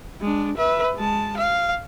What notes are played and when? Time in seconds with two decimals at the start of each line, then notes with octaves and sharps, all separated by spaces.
0.21 G#3 D4
0.58 B4 E5
0.96 G#3 A5
1.37 F5